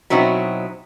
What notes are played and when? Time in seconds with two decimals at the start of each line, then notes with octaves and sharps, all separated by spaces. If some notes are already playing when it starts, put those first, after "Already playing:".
0.10 B2 F#3 C4 D#4 E4